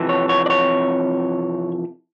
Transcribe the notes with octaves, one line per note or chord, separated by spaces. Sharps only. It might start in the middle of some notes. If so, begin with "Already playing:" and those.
Already playing: F2 C3 E3
C#5
C#5
D5
C#5